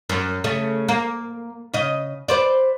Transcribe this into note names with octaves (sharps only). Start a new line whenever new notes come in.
F#2
C#3 A3
A#3
C#3 D#5
B4 C5 D5